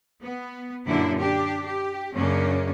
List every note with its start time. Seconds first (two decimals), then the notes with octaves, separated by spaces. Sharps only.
0.22 B3
0.88 F#2 A#2 D3 D4 E4
1.19 D4 G4
1.65 G4
2.16 F#2 C#3 A#3 C#4 D4